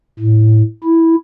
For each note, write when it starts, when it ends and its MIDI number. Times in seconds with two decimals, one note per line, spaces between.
0.20 0.62 45
0.83 1.15 64